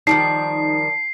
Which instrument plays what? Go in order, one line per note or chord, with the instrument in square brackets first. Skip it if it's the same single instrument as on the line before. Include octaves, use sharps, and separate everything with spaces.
[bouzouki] D#3 F3 G3 [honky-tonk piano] D#4 [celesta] A5 [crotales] C7